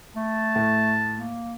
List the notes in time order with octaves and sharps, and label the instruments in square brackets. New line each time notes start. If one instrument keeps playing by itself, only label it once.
[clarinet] A3 [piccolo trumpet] A5
[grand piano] A2
[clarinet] A#3